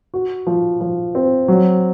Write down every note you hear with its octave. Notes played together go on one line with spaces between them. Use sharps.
F#4
F3
F3
C4
F#3